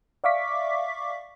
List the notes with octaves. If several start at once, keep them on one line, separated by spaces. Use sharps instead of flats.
D5 E5 F5 C#6 D6 B6